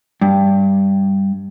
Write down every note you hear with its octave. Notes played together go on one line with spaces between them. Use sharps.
G2